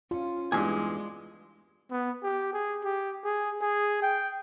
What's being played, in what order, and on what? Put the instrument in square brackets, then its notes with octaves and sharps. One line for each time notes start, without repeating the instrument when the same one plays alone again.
[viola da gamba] C#4 [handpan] F4
[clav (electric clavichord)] E2 G2 [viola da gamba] G#3 [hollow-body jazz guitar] G#5
[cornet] B3
G4
G#4
G4
G#4
G#4
G5